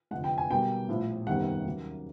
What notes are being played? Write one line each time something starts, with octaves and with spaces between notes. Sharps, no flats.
F1 F2 D3 F3 G#3 F#5
G5
G#5
B1 B2 G3 A#3 G5
A#1 A2 F3
F#1 E2 C3 D#3 G3 F#5
D#2 C#3 F#3 A#3